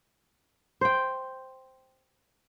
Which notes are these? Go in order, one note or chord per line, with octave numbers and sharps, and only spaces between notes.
C5 G5